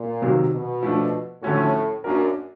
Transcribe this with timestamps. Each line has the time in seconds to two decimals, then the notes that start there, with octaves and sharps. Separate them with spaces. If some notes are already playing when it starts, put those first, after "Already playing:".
Already playing: A#2
0.22 C3 D#3 F#3
0.52 B2
0.83 F3 A3 D4
1.43 A2 D3 F3 A3 C#4 F#4
2.04 F#2 A#3 D4 F#4 A#4